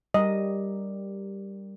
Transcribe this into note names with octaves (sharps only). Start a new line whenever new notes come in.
G3 G4 A#4 D#5